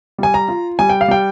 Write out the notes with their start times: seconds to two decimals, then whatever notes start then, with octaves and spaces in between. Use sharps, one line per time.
0.18 G3 G#5
0.34 A#5
0.48 F4
0.79 G3 G#5
0.89 G5
1.01 F5
1.08 G3 G5